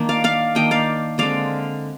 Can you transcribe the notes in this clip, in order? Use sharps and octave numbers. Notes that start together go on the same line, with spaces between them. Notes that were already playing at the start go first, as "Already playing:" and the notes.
Already playing: D#3 A#3 D4
D5 F5
D5 F5
D#3 A#3 D4 D#5 G5
D5 F5
D3 G#3 C4 D5 F5